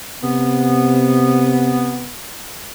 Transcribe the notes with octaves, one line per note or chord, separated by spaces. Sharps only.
C3 B3